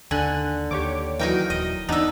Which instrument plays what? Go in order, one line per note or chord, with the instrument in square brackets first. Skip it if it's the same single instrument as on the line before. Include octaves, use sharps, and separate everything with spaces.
[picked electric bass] D#2 [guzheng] D3 [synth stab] G#5 F#6
[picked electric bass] D#2 [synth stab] G4 C#5 D6
[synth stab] E3 F#3 [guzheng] D#4 A#4 G5
[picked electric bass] D#1 [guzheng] D#5
[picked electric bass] E2 [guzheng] B3 E5 [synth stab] D4 D#4 A#5